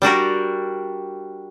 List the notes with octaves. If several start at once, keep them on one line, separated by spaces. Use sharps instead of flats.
G3 D4 F#4 A#4